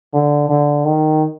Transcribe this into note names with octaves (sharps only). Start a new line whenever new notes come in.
D3
D3
D#3